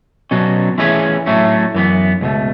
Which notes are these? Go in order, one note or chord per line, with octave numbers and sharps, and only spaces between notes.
B2 F#3 C#4 F#4 A4
E3 A3 C#4 G#4 B4
A2 F#3 A3 C#4
F#2 E3 B3
C#2 B2 A3